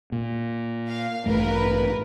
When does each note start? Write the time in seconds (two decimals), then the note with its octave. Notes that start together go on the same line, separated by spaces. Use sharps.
0.12 A#2
0.89 F5
1.26 A1 G2 A3 A#4 B4